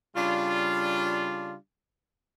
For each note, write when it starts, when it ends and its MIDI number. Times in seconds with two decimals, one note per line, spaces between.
0.16 1.55 49
0.16 1.55 55
0.16 1.55 62
0.16 1.55 65